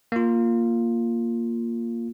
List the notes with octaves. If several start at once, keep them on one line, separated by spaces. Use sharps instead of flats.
A#3 F4